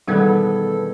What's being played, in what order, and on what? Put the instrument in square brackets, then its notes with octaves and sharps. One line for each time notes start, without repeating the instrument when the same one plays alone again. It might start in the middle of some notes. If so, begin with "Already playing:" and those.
[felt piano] E1 D#3 G#6 [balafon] G3 G#3 F#5 [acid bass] B3 [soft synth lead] A4